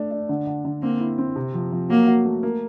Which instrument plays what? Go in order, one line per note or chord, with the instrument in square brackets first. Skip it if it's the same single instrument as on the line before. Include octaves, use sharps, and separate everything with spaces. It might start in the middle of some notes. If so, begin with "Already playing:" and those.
Already playing: [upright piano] A3 D4
D4
D3
D3
D3
[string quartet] A#3 [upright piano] C4
[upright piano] E4
C4
C3
F3
F3
[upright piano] F#3 [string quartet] A#3
[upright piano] F#4
A3
A#3